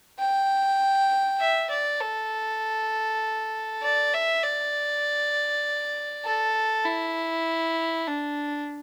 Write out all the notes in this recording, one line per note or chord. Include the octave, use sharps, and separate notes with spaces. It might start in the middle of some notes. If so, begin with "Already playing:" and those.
G5
E5
D5
A4
D5
E5
D5
A4
E4
D4